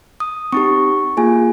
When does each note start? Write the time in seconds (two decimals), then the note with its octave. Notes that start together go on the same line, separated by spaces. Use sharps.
0.20 D#6
0.52 C4 D#4 G4 C#6
1.17 A#3 F4 G#4 G#5